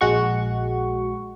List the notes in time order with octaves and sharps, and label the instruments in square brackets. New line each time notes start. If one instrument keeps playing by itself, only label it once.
[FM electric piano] A#1 G#3 F#4 C#6